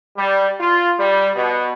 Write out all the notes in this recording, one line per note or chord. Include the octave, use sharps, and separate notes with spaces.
G3
F4
G3
B2